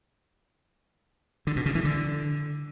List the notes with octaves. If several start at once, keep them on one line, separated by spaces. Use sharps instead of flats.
D3
B2
C#3
E3
D3